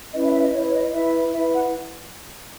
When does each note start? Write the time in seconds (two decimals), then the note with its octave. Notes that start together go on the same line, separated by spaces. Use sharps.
0.13 C#4 E4 B4 D#5
0.23 E5
0.33 E5
0.42 D#5
0.52 E4 C#5
0.57 B4
0.66 C#5
0.73 D#5
0.92 E4 B4 E5
1.32 E4 B4 E5
1.52 F#5